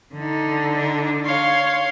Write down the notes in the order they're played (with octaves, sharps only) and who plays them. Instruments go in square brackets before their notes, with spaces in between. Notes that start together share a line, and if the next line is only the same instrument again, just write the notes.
[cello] D3 D#4
[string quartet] D4
C#5 F5 C6